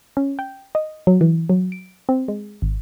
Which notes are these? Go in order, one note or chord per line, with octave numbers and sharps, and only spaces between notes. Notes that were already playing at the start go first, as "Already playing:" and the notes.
C#4
G5
D#5
F#3
E3
F#3
D7
C4
G#3
G#1